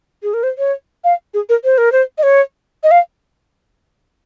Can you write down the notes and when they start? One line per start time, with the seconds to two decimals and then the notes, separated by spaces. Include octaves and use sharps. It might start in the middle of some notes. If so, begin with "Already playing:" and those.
0.23 G#4
0.34 A#4
0.43 C5
0.58 C#5
1.04 F5
1.34 G#4
1.49 A#4
1.64 C5
1.78 A#4
1.92 C5
2.18 D#5
2.23 C#5
2.83 D#5
2.91 F5